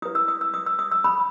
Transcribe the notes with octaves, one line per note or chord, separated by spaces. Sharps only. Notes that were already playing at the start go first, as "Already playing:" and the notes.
E4 B4 D#6
E6
D#6
E6
D#6
E6
D#6
E6
B5 D#6